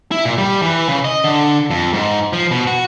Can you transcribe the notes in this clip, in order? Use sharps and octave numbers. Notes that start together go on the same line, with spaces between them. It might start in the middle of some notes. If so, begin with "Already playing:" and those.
E4
A#2
G3
E3
C#3
D#5
D3
F2
G#2
F3
B2
F#4